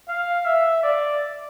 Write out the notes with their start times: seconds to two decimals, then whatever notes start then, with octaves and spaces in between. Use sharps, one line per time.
0.08 F5
0.45 E5
0.83 D5